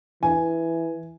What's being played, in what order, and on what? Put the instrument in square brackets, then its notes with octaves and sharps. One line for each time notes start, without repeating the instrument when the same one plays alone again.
[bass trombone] E3 [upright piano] G#5